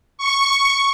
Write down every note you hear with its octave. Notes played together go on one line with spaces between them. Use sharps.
C#6